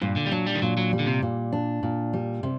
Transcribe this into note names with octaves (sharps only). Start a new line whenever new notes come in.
G2 A#2
D3
G3
F#3 D4
G3
D#3
A#2 F#3
F#3
G3
D3
C3
A#2
D4
A#2
G3
C3